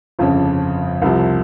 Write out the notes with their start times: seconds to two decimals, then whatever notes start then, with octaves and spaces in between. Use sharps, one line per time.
0.19 G1 F2 C#3 F3
1.02 C2 C3 F3